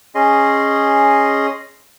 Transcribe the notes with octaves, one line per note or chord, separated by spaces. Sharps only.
C#4 G#4 D#5 C6